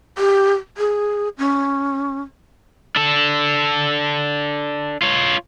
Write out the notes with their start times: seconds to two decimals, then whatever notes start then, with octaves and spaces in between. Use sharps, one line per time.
0.18 G4
0.78 G#4
1.38 C#4
2.96 D4 A4
5.02 F4 C#5